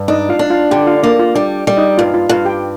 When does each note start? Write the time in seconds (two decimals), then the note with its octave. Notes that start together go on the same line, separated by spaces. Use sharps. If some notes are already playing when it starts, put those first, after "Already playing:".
Already playing: G2
0.08 D4 D#4 D#5
0.29 F4 F5
0.39 D4
0.50 F4 F5
0.71 D3 G4 G5
0.87 F4 F5
1.03 A#3 D4 D5
1.19 F4 F5
1.35 G3 D4 D5
1.67 G3
1.77 D#4 D#5
1.98 G2 F4 F5
2.14 F4 F5
2.29 G2 F4 F5
2.45 G4 G5